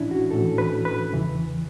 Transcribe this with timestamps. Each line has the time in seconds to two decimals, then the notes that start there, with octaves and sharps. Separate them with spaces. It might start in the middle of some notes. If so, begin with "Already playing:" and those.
Already playing: A2 E3 C#4 D4 E4
0.11 F#4
0.31 A2 E3 A4
0.58 B4
0.85 B4
1.13 E2 C#3 E3